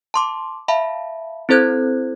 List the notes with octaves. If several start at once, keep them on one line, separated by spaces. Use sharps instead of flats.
A5 C6 D6
E5 F5 A5 B5
C4 E4 A4 C5 F#6 G#6